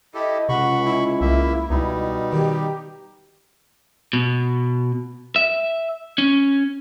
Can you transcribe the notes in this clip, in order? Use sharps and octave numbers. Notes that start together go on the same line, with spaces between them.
E4 G4 A4 D#5
C#2 C3 F#5 B5 C#6
E4
C2 A#3 E5
C#2 B2 G3 D#4
D#3 G4
B2
E5
C#4